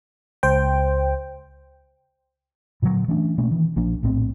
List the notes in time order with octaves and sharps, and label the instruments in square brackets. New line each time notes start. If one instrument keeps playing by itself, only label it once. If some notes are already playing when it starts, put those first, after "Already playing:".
[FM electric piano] C#2 C5 G5
[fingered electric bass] A#2 D3 F3 F#3
E3 A3 C#4 D4
B2 A3 A#3 C#4
D#3 E3
A#1 F3 A#3 D4
A#1 A2 B3 C4